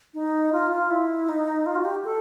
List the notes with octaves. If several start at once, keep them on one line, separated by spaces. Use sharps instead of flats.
D#4
F4
F4
E4
D#4
F4
F#4
G4
A4